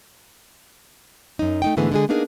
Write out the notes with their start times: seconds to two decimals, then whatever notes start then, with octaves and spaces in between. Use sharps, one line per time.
1.39 F#2 D#4
1.62 A3 D#4 G5
1.77 G#2 D3 E3 A3 B3 G#4
1.92 D3 G#3 G#4
2.09 A#3 B3 D4 D#4 G#4 A#4